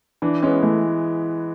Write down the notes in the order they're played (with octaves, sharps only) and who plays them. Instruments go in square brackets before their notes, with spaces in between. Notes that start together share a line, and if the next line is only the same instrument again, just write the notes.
[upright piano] E3 [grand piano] D4
[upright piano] G#3 B3 [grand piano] C#4
[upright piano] E3 [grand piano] A3